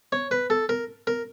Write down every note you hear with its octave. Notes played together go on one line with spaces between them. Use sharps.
C#5
B4
A4
A#4
A#4